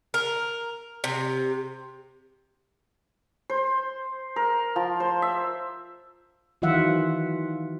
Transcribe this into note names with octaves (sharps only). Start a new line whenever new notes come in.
A#4
C3
C5
A#4
F3
C5
E5
D#3 E3 F#3 F4 E5 F#5